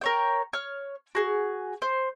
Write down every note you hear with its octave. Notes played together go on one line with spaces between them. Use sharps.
A#4 C#5 G5
C#5 F6
F#4 G#4
C5